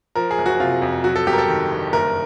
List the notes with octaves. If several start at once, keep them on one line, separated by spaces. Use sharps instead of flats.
F3 A#4
G#4
F#1
F#4
C3 F4
F2
F#3 F#4
A4
G1 G4
A#4
A4
D#3
G2
F#1 A#4